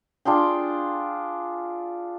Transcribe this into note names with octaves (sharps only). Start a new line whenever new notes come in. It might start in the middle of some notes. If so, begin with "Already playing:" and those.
D4 F4 G#4 G5